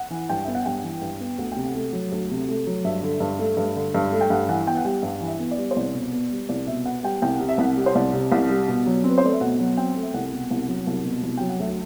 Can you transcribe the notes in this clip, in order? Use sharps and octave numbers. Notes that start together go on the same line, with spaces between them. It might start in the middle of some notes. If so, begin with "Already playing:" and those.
Already playing: F#5
E3
G2 G5
B3 E5
F#5
G2 G5
E3
G2
B3
D2 F#5
C3 G5
F#5
A3
F#3
D2
C3
A3
F#3
G2 E5
D3
G2
A3
G2
D3
G2
A3
G5
G2 F#5
E3 F#5
B3 G5
F#5
G3 G5
G2 F#5
E3
E5
B3
D5
G3
C5
C2 D5
B2
B3
G3
C2 D5
B2 E5
B3 F#5
G3 G5
C2 G5
C3 F#5
E5
C2 F#5
G3
C5
C2 D5
C3
C2
G3
B2
F#3
C4
B4
C5
A3 D5
E5
B2 F#5
F#3
C4 G5
A3
E5
C2 F#5
B2
C2
F#3
C2
B2
C2
F#3 G5
F#5
D2 E5